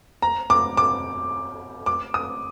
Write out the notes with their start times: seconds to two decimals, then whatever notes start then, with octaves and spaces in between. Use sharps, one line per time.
0.22 A#5
0.50 D6
0.77 D6
1.86 D6
2.14 D#6